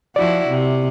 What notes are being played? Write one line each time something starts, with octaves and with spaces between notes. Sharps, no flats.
F3 E4 F#4 D5
C3